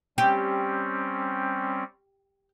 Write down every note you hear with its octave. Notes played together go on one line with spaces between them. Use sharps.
G3 C4 C#4 G4